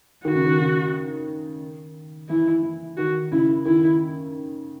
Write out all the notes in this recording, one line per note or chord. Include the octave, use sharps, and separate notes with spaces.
D#3 F#4
C#3
D#3
C#3
E3 E4
E3
D#3 F#4
C#3 E4
D#3 E4